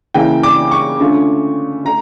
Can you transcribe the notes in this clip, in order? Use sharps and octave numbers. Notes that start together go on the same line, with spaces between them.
C#3 E3 A#3 E4 G5
D6
C#6
D3 A3 C#4 F4
A3 A#5